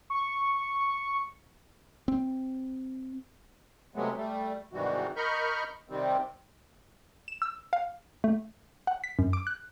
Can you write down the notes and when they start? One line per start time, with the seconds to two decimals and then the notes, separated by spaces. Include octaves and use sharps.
0.10 C#6
2.08 C4
3.95 C3 F#3 G#3 A3 B3
4.16 G3 A3
4.73 G#2 C3 D#3 E3 G3 F#4
5.16 A#4 D#5 B5 C#6 F6 G6
5.89 C3 D#3 G3 C4
7.28 E7
7.42 E6
7.73 F5
8.24 A3
8.87 F#5
9.04 B6
9.19 F#2
9.33 D6
9.47 F#6